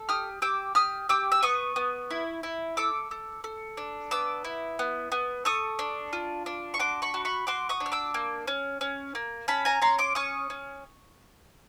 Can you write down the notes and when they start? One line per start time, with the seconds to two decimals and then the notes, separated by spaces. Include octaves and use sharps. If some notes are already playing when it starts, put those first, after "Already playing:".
Already playing: A4
0.09 G4 D#6 F6
0.42 G4 D6 E6
0.75 G4 D#6 F6
1.09 G4 D6 E6
1.32 E6
1.43 B3 C#6 D#6
1.76 B3
2.11 E4
2.43 E4
2.77 A4 D6 E6
3.11 A4
3.44 A4
3.77 D4
4.11 B3 D6 E6
4.45 E4
4.79 B3
5.12 B3
5.45 A4 C#6 D#6
5.79 D4
6.13 F4
6.46 D4
6.74 C#6
6.79 F#4 C6 D6
7.02 B5 C#6
7.14 F#4
7.25 B5 C#6
7.47 F#4 C6 D6
7.69 C#6 D#6
7.80 D4
7.86 F6
7.92 D6 E6
8.14 A#3
8.48 C#4
8.81 C#4
9.15 A#3
9.48 C#4 A5 B5
9.65 G#5 A#5
9.82 C#4 A#5 C6
9.99 C6 D6
10.15 C#4 C#6 D#6
10.50 C#4